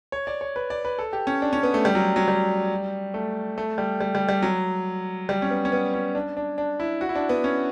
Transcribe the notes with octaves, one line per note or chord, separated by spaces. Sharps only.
C#5
D5
C#5
B4
D5
B4
A4
G4
C#4
D4
C#4
B3
A3
G3
F#3
F#3
G3
A3
A3
G3
G3
G3
G3
F#3
G3
C#4
B3
C#4
B3
C#4
D4
D4
D4
E4
F#4
E4
D4
B3
C#4